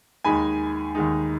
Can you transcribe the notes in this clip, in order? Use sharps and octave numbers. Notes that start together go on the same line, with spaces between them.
D#2 D#3 G#3 D#4 G#5 B5
D#2 D#3 G#3 D#4